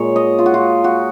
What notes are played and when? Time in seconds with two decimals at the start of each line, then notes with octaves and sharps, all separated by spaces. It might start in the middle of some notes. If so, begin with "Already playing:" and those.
Already playing: A#2 G#3 A#4 C#5
0.16 D#5
0.39 F4
0.46 F#4
0.54 F4
0.84 F#4